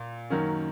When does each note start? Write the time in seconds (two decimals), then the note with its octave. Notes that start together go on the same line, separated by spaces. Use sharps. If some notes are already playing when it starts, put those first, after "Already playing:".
Already playing: A#2
0.30 F#2 D#3 F#3 A#3 C#4